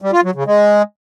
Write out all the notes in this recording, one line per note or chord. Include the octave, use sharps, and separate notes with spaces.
G3
F4
F#3
C#3
G#3